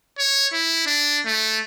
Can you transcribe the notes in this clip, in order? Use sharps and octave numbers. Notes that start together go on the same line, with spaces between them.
C#5
E4
D4
A3